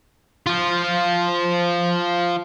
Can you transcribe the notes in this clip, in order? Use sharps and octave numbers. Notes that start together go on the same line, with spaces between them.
F3 F4